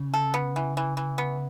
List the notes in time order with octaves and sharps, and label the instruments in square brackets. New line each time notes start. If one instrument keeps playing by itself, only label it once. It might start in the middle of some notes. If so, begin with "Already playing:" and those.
Already playing: [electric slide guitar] C#3
[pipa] A4
B3
E3
E3
E3
B3